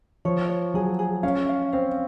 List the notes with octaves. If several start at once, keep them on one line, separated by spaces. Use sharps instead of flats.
F3 C#5
C#5
F#3 G#4
G#4
C#4 F5
F5
C4 F5